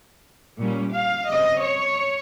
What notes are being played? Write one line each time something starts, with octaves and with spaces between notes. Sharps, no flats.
A#2 G3 C#4
F5
C#3 G3 C4 D#5
C#5